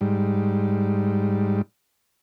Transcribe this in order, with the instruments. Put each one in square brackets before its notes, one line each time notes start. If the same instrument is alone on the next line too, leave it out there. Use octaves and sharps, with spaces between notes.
[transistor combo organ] G#2 G3